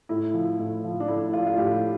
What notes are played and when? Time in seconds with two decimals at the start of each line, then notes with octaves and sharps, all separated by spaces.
0.09 A2 E4
0.34 F3
0.59 A2
0.84 F3
1.00 D4
1.08 A2 E4
1.33 F3 F4
1.47 F4
1.57 A2 G4